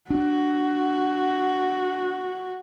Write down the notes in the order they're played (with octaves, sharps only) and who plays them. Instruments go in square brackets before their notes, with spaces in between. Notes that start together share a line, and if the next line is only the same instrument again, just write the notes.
[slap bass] D4 [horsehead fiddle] F#4